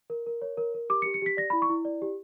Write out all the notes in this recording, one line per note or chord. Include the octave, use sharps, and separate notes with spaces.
A#4
A#4
C#5
A#4
A#4
G4 D6
C#7
G4
C#7
G4 B6
D5 A#6
B5
E4
C#6
E4
D5
G4